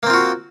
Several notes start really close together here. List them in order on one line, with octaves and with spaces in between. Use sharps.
A#3 C4 F4 F#4